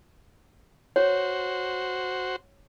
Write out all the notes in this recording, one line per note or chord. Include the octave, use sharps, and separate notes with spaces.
F#4 C5 C#5